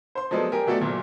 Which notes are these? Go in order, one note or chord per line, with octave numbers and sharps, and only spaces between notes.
C5 C6
F3 F#3 G#3 B3 A4 D5
G4 A#4 G#5
B2 A3 F#4 A4 D5
F#1 A#2 F#3